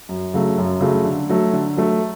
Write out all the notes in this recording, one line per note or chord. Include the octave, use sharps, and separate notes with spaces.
F#2
C#3 F#3 A3
F#2
C#3 F#3 A3
D3
F#3 A3
D3
F#3 A3